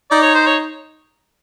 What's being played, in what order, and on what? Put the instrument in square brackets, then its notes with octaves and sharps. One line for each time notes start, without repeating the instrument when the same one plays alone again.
[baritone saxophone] D#4 [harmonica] D5
[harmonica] C#5
C5
C#5